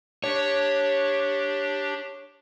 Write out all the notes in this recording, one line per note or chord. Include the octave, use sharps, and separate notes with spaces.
D4 G4 C#5